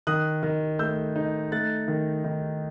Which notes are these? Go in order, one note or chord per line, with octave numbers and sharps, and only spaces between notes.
D#3 D#6 F#6
D#3
A3 E6 G6
D#4
A3 F#6 A6
D#3
D#3